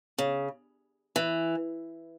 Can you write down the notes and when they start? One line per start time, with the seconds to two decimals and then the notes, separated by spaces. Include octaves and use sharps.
0.18 C#3
1.16 E3